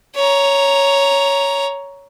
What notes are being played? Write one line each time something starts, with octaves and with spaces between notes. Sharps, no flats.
C#5 A#5